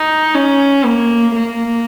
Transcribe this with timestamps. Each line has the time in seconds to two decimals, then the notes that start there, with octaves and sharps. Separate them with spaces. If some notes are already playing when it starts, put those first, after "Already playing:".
Already playing: D#4
0.34 C#4
0.85 A#3
1.36 A#3